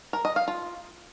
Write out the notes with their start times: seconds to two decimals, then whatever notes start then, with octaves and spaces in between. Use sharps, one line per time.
0.13 A#4
0.25 D#5
0.36 F5
0.48 F4